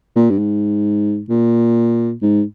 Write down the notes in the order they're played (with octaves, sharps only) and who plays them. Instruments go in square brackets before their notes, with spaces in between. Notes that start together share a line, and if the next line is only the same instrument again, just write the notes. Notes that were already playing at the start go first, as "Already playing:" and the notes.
[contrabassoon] A#2
G2
G#2
A#2
G#2